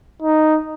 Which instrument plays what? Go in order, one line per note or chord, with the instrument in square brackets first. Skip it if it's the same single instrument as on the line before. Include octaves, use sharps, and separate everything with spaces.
[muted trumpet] D#4